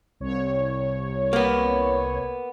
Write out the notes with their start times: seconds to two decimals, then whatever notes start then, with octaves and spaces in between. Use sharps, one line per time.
0.20 C2 C#5
1.33 A#3 B3